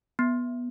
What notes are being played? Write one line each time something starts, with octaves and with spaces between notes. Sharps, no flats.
B3